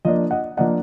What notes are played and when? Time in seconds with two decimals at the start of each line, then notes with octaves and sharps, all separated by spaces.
0.05 F3 A#3 D4 D#5
0.31 D#5 F#5
0.57 F3 A#3 D4 D#5 F#5